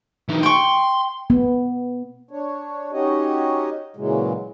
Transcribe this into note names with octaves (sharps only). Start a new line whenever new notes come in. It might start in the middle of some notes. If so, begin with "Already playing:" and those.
E3 D#4
G5 C6 C#6
B3
D4 C#5
C#4 D#4 F#4 G4 C#5 D#5
A#2 C#3 E3 F#3 G#3